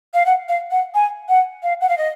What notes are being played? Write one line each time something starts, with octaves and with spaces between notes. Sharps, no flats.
F5
F#5
F5
F#5
G#5
F#5
F5
F#5
F5
D#5